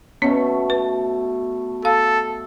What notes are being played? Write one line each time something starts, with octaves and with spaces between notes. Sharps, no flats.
B2 A3 B3 C#4 F#4 C#5
B4
A4 F5